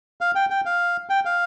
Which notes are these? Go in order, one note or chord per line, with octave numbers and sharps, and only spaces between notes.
F5
G5
G5
F5
G5
F5